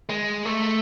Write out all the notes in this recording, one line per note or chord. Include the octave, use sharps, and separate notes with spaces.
G#3
A3